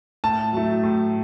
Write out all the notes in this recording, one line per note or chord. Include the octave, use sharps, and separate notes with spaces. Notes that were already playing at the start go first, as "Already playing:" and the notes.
A2 A5
F#3 A3
A2